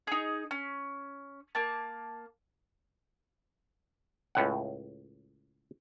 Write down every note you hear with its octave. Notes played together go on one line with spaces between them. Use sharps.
D#4 G#4
C#4
A#3 A5
C#2 A2 F#5